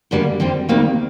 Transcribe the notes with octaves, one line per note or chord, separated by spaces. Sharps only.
F#2 D3 G3 A#3
D3 G3 C4 G4
D2 C3 D#3 G3 A#3